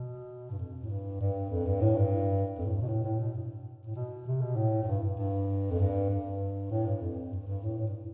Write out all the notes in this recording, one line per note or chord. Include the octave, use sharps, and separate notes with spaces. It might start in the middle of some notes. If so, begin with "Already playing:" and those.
Already playing: B2
G2
F2
A2
G2
G2
F2
G2
A2
G2
F2
A2
G2
B2
A2
A2
B2
G2
A2
B2
C3
B2
A2
A2
G2
G2
G2
F2
G2
G2
A2
G2
F2
G2
G2
A2
A2
G2